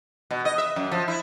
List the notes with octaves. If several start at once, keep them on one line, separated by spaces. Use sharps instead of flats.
B2
D#5
E5
F#2
F3
E4